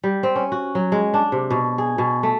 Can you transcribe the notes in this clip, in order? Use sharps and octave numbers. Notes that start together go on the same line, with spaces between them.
G3
C4
C#4
F#4
F#3
G#3
D4
C3
B2
G#4
B2
A3